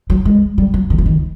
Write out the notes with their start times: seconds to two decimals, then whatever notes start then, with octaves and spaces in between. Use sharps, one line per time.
0.10 F#3
0.25 G#3
0.58 G3
0.74 F#3
0.90 D#3
0.98 E3
1.06 D#3